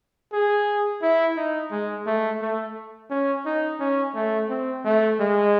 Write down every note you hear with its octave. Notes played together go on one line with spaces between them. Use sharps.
G#4
E4
D#4
G#3
A3
A3
C#4
D#4
C#4
A3
C4
A3
G#3